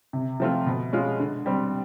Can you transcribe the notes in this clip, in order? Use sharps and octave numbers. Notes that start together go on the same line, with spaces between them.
C3
F3 A3 C4 F4
B2
G#3 C#4 F4
D3
G3 C4